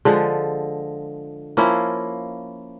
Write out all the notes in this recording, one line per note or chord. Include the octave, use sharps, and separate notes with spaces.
D3 F3 G#3
F3 A#3 C#4 E4